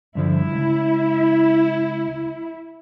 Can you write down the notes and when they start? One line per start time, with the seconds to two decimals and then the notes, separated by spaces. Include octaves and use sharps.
0.15 G2 D3 F3 E4
0.52 C#2